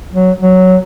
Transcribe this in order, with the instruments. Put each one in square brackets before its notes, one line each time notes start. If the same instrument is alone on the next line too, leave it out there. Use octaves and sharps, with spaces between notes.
[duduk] F#3
F#3